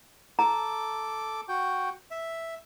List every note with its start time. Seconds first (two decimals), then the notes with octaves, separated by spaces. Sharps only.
0.39 A4 A#5 D6
1.49 F#4 G5
2.11 E5